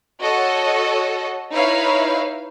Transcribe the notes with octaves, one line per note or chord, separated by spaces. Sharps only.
F#4 A4 C#5 D#5
D#4 E4 B4 C#5 F5